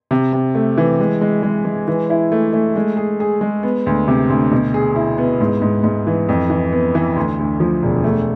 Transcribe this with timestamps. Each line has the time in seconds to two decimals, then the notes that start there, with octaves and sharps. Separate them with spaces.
0.11 C3
0.33 C3
0.55 A3
0.77 E3
1.00 G#3
1.21 G#3
1.43 G#3
1.65 G#3
1.88 E3
2.10 E4
2.32 A3
2.53 A3
2.76 G#3
2.97 G#4
3.20 G#4
3.41 G#3
3.63 B3
3.86 D2
4.08 C3
4.29 D2
4.51 B2
4.74 G#4
4.96 E4
5.18 B3
5.40 G#2
5.62 G#2
5.84 G#2
6.07 E3
6.29 F2
6.50 E3
6.72 B3
6.95 E3
7.16 D2
7.39 D2
7.60 F3
7.83 E1
8.04 A3